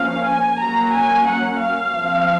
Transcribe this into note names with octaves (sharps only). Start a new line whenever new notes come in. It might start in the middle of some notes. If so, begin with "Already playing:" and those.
Already playing: F3 A#3 C#4 F5
G#5
F#3 A#3 C#4 A#5
G#5
F#5
F5
F3 C4